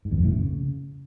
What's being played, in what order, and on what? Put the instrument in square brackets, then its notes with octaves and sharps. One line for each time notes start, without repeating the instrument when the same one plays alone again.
[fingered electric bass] G#2
E2
F2
A2
C#3